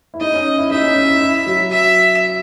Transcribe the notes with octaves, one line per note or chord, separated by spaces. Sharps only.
E4
D#4 D#5
C#4
E4
D#4 E5
C#4
D#4
E4
E4
F#3
E5